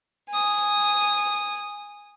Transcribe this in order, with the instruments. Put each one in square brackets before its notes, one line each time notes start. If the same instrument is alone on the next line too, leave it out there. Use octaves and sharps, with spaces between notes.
[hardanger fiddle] G#5 D#6